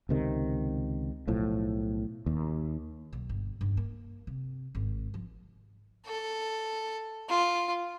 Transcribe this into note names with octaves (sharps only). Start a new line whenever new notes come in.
C#2 C3 D#3
B1 A2 F3
D#2
B1
G1
G2
A#3
C3
G#1
F3
A4
F4